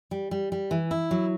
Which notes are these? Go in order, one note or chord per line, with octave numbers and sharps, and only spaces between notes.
G3
G3
G3
E3
E4
F#3